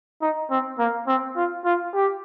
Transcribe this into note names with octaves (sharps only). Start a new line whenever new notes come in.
D#4
C4
A#3
C4
F4
F4
G4